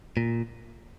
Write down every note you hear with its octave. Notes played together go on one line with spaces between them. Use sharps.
A#2